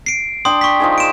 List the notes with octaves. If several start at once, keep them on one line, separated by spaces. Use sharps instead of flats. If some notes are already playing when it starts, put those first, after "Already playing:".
C7 D7
D4 G5 C6 D#6
C#6 B6
F3 D#4 G#4
D7 E7